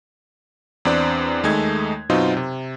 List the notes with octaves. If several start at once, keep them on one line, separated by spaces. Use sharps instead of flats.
E2 C4 D4 D5 F#6
D#2 G#3 A3 D#4 G#6
F#2 B2 F#3 C4 D#4 F4
C3